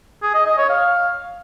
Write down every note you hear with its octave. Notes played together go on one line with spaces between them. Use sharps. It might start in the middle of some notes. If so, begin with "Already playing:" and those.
G#4
D#5
D#5
C#5
F5